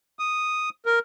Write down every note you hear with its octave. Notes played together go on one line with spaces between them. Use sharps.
D#6
A#4